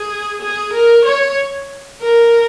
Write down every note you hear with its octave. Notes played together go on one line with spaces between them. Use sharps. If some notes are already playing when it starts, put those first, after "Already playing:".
Already playing: G#4
G#4
A#4
C#5
A#4